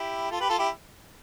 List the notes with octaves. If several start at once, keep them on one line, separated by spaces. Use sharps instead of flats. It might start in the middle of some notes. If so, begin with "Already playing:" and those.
Already playing: E4 G4
F4 A4
G4 B4
F4 A4
E4 G4